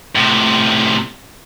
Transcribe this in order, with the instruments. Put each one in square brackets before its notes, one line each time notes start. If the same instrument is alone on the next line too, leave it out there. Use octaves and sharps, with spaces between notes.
[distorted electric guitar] A2 C3